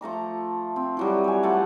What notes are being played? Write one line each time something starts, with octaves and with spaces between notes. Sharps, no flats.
F3 A3 A#5 D6
C4
E3 F#3 G3
C#5 G#5
F3 G3 A3 F#5